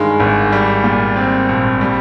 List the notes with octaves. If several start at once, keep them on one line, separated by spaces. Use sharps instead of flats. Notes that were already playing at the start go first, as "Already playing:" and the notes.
Already playing: G2 D#3 G#3
G#1
G3
A#2
C4
A#1
G3